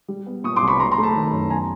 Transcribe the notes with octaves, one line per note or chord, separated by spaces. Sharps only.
G3
B3
A#2 C#6 D#6
C6 D6
C2
B5 C#6
F#3 A#5 C6
A#5 C6
A3
A5 B5
D#3
F#2
B3 G#5 A#5